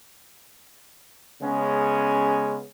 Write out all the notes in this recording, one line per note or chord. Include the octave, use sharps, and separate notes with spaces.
C#3 G#3 B3 C#4